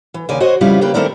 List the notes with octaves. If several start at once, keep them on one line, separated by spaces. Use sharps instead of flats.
E3
D#2 C#3 D5 G#5
F#4 C5 C#5 D#5
F2 C#3 G3 E4 F4
C#3 A#3 G4 B4
D#3 A3 C4 E4 A#4 D5